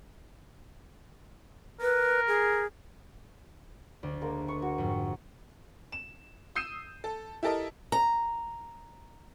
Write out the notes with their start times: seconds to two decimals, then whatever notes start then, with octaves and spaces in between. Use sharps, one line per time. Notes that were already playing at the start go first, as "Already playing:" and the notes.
1.81 A#4 B4
2.28 G#4
4.03 D2 D5
4.21 G#3 A#3 A#4
4.48 C#6 D#6
4.62 F#4
4.78 F2 G#2
5.92 E7
6.56 D#6 E6 G6 C7 D#7 E7
7.04 A4
7.43 E4 G4 A4 A#4 D#5
7.92 A#5